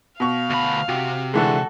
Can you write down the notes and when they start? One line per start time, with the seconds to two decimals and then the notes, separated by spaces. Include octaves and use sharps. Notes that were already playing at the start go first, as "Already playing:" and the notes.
0.20 B2 F5 C#6
0.50 D2 B5
0.89 C3 F#4
1.34 D3 E3 G#3 F#4 A4